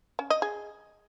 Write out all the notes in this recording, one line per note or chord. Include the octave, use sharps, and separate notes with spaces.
C#4
D#5
G#4